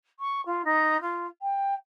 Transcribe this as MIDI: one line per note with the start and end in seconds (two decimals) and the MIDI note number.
0.19 0.41 85
0.46 0.62 65
0.65 1.00 63
1.01 1.27 65
1.42 1.74 79